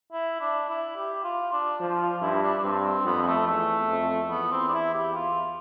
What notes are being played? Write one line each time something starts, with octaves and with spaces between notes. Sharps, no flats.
E4
D4
E4
G4
F4
D4
F3
F4
G2 E4
D4
D4
G2 C4
C4
F2 B3
B3
A3
E2 A3
F2
E2 B3
C4
D4
E4
G4
F4